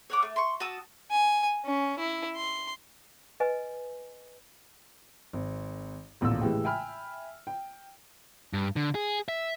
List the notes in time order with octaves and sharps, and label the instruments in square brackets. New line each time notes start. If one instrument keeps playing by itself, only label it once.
[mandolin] C#5 F#5 D6
A3
C6 C#6
F#4 A5 D#6 E6
[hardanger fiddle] G#5
C#4
E4
C6
[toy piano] B4 D#5 G#5
[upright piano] G#1
D#1 A1 E2 A#2 E6
A2 C#3 E3 G#3 G4
E5 G5 G#5 B5 F6
G5
[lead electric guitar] G2
D3
G#4
E5